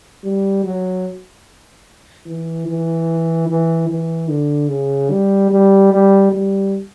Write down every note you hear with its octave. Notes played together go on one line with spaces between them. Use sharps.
G3
F#3
E3
E3
E3
E3
D3
C#3
G3
G3
G3
G3